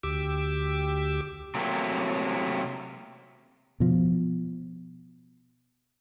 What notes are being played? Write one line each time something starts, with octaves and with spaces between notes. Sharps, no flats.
D2 G4 D6 E6
C3 F#3 A3 A#3
B2 F3